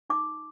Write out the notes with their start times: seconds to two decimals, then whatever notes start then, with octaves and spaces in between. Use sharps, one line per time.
0.10 D#4 D6